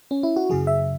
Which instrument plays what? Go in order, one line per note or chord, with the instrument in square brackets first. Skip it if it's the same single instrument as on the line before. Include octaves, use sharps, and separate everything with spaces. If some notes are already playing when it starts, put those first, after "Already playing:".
[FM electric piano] C#4
E4
F#4
F#2 C#3 F#3 G#4
E5